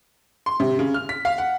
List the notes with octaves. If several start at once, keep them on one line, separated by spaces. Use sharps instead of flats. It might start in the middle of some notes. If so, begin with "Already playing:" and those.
C6
C3
C#3
F6
B6
F5
F#5